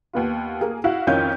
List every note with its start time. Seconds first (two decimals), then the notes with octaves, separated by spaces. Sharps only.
0.13 D#2 B3 F4
0.61 A#3 G#4
0.84 E4 F#4 F5
1.07 F2 D#3 C#4 E4 F4 G6